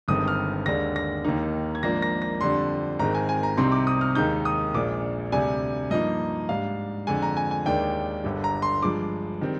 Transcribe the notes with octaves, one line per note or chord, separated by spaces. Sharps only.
G1 G2 D#3 G#3 C4 D#6
F6
D#2 D3 G#3 D4 A#6
A#6
D#2 D#3 A#3 D#4
G#6
G#1 G#2 F3 A#3 D4 A#6
A#6
A#6
F2 D3 G3 D4 C6
G#1 G#2 D#3 G#3 C4 A#5
G#5
G#5
A#5
C2 C3 G3 C4 D#4 C6
D6
D#6
F6
D#2 D#3 G#3 D#4 G6
D#6
A#1 A#2 G#3 D4 D6
D2 C3 G3 D4 G#5
G2 F3 A#3 D#4 D#5
G#2 G3 D4 F5
F2 D3 G#3 G#5
A#5
G#5
G#5
D#2 D#3 G#3 D4 G5
G1 G2 D3 G3
A#5
C6
G2 F3 G#3 D6
D#3 G3 C4